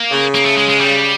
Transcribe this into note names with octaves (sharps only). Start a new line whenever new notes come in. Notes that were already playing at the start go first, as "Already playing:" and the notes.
Already playing: A#3
C#3
A#3
A3
G#3
G#3
G3